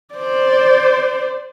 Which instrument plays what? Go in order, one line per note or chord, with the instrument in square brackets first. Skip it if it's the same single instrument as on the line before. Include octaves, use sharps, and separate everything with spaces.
[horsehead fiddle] C5 D5